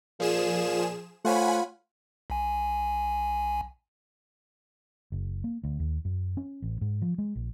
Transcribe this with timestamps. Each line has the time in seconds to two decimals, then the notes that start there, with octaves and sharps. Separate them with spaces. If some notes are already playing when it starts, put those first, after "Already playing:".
0.20 A#2 F3 G#4 E7
1.25 A3 F4 C5 C#5 F#5 G#5 B5
2.30 B1 G#5
5.12 F#1
5.44 A#3
5.64 D2
5.80 D#2
6.05 F#2
6.37 C#4
6.62 A1
6.81 G#2
7.02 F3
7.18 G#3
7.35 A#1